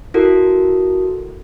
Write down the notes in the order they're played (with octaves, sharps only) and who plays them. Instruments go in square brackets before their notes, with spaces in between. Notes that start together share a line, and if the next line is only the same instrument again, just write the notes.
[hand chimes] E4 F#4 A4 A#4